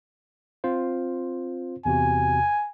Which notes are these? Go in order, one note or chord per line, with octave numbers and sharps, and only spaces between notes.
C4 F4 C5
E2 C3 F#4 G#5